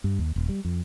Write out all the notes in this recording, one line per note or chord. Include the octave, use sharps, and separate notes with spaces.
G2
D#2
D#1
G3
F2